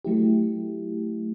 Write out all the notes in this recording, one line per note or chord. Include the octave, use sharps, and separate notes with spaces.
F#3 A3 E4 G4